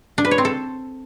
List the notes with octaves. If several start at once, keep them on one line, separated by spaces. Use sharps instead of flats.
D4
B4
C#5
C4
A4